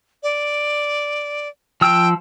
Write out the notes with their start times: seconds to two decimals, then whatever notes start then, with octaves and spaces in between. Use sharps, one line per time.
0.23 D5
1.81 F3 G5 E6